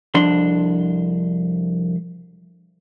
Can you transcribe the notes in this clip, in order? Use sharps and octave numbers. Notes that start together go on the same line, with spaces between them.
C2 F2 D4 C6